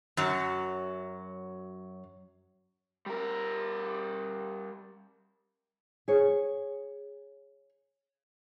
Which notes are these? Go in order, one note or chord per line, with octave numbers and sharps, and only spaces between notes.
F#2 F#3
G3 A#4
G#4 C#5